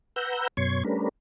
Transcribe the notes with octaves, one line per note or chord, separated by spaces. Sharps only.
B4 F#5 A#5 E6 G6
F#2 B2 C#5 C6 C#6 G#6
G3 A3 C#4 D4 A#4 B4